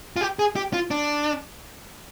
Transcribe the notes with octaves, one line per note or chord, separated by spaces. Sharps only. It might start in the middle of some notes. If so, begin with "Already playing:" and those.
F4
G4
G#4
G4
F4
D4